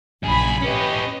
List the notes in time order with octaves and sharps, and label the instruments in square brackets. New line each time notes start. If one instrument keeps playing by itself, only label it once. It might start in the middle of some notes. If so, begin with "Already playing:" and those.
[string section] A#1 B5 [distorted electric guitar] F#2 G#4
[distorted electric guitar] C#4 G4 [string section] B4 D#5